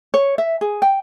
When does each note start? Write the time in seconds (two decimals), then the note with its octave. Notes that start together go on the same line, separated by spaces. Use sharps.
0.14 C#5
0.38 E5
0.61 G#4
0.82 G5